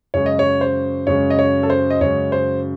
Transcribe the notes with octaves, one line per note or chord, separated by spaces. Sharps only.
F#2 C#3 G#3 C#5
D#5
C#5
C5
F#2 C#3 G#3 C#5
D#5
C#5
A4
C5
D#5
F#2 C#3 G#3 C#5
C5